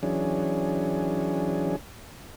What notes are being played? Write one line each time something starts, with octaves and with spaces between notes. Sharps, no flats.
E3 F#3 C#4 D4 G#4